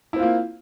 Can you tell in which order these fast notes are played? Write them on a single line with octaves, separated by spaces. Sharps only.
E4 C4 F4 A#3